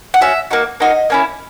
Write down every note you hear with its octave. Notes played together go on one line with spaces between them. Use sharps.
F#5
C#4 F#4 E5
A#3 D#4 F#4
A#3 D#4 F#4 D#5
A#3 C#4 E4